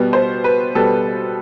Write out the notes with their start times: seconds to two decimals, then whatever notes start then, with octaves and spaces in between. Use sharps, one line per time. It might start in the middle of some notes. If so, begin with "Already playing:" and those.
Already playing: B2 G3 B3
0.13 C5
0.44 B4
0.75 B2 G3 B3 A4